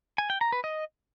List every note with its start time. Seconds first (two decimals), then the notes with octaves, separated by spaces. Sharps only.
0.18 G#5
0.30 G5
0.41 A#5
0.52 B4
0.64 D#5